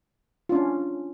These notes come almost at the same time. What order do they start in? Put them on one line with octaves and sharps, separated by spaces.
F4 D4 C#4